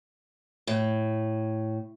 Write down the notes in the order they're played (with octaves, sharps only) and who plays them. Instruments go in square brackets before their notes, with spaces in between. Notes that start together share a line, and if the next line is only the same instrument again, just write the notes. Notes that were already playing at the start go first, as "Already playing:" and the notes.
[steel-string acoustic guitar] A2